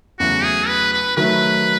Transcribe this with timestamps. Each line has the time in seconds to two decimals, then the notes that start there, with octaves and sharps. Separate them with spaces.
0.19 E2 C#3 F#3 A3 F#4
0.44 G#4
0.68 B4
0.92 B4
1.17 D#3 F#3 A3 B4